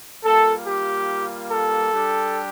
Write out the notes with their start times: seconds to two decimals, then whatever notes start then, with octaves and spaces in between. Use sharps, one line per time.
0.23 G3 A#3 F4 A4
0.65 G4
1.49 A4
1.92 G3 D4 G4